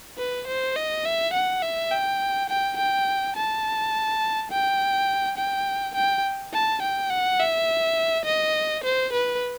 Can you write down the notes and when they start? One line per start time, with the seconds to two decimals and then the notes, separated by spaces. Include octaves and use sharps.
0.18 B4
0.47 C5
0.76 D#5
1.05 E5
1.34 F#5
1.62 E5
1.91 G5
2.49 G5
2.78 G5
3.36 A5
4.51 G5
5.37 G5
5.95 G5
6.53 A5
6.82 G5
7.11 F#5
7.40 E5
8.25 D#5
8.84 C5
9.13 B4